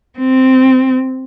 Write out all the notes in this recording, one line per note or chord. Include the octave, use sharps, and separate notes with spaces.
C4